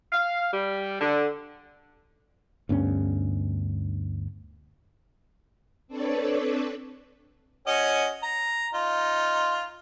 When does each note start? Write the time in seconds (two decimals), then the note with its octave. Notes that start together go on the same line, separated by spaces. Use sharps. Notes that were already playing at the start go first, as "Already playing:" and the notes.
0.12 F5
0.52 G3
1.00 D3
2.69 D2 G2 B3 C#4
5.88 C4 D4 A4 B4 C#5 D5
7.67 C#4 F#4 D#5
8.23 A#5
8.74 D#4 F4